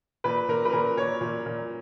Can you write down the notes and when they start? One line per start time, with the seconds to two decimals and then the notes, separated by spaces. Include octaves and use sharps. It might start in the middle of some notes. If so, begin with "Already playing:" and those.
0.24 A#2 B4
0.48 A#2 A#4
0.65 B4
0.73 A#2 A#4
0.97 A#2 C#5
1.21 A#2
1.46 A#2